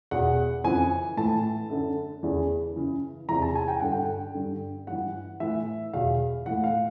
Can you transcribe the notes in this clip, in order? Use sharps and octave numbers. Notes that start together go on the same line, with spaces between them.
E2 B2 F#5
F2 C#3 E3 G#5
A2 E3 A5
F#2 D3
E2 C#3 E3
F#2 C#3 E3
E2 C3 E3 A#5
A5
G#5
G5
G2 D3 F#5
G5
G2 D3
G2 E3 F#5
A2 E3 E5
E2 B2 F5
A2 E3 F#5
F5